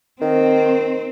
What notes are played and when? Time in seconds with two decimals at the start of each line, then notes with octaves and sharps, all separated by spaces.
0.21 D#3 C4